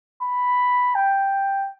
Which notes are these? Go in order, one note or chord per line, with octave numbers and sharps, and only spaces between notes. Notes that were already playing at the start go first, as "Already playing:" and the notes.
B5
G5